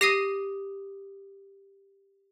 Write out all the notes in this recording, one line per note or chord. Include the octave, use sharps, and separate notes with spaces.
G4 D#6 A#6 C7 D#7